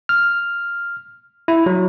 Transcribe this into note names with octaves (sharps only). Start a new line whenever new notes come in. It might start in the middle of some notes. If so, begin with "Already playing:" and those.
F6
E4
F#3